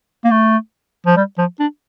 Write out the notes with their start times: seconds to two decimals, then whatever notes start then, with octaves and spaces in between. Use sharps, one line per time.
0.25 A#3
0.31 A3
1.06 F3
1.17 G3
1.38 F3
1.60 D4